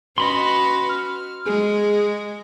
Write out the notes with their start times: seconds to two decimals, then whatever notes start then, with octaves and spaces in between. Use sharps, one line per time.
0.18 C#4 F#4 B4 D#5 B5 C6
0.89 F6
1.46 G#3 G#4